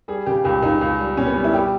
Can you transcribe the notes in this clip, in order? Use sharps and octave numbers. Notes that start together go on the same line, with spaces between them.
G3 G#4
C#3 G4
C#2 G4
C#2 D#4
C#2
G3
B2 C#4
B3
G3
E4
G3 G4